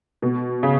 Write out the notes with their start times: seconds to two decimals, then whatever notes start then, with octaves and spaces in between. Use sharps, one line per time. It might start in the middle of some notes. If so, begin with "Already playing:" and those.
0.22 B2
0.63 C#3